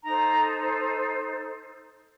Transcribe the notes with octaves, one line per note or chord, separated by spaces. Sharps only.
D#4 A4 C5 A#5